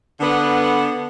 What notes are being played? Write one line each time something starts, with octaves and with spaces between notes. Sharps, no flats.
D3 B3